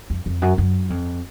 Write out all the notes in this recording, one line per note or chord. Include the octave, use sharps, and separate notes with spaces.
F2
F2
F#2
F#2
F2